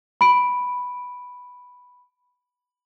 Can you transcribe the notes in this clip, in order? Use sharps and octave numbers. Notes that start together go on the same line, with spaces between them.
B5 D7